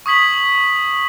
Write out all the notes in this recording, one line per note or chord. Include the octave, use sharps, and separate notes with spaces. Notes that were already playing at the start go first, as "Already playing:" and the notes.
C#6 D#6 G#6 B6 F#7